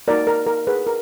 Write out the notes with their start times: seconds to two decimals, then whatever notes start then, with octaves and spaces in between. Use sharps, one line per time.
0.08 A#3 D#4 F#4 A#4 D5
0.27 A#4
0.47 A#4
0.67 G#4 B4
0.87 A#4